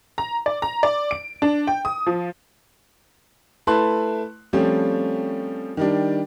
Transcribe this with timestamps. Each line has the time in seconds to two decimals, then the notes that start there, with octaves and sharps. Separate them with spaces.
0.18 A#5
0.46 D5
0.62 A#5
0.83 D5
1.11 D7
1.42 D4
1.67 G5
1.85 D#6
2.07 F3
3.67 A3 E4 B4 A5 C6 F#6
4.53 F3 G3 A3 C4 C#4
5.77 D#3 G3 D4